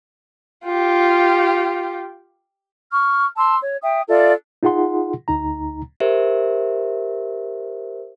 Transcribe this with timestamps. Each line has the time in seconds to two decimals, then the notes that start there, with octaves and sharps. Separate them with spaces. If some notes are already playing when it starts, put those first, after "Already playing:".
0.64 F4 G4
2.91 C#6 F6
3.37 A5 C6 E6
3.61 C#5
3.81 E5 G5 D#6
4.08 F4 A4 D5 E5
4.63 D#4 F4 G#4 F#5 C6
5.28 D2 D#4 A#5
6.00 G4 A#4 C5 E5